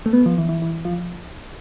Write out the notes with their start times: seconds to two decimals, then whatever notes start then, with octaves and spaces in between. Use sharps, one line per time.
0.06 A3
0.13 B3
0.26 F3
0.38 E3
0.49 E3
0.62 E3
0.85 F3